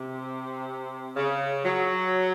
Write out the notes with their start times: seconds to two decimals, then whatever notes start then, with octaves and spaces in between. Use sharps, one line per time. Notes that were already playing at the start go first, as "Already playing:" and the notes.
Already playing: C3
1.16 C#3
1.64 F#3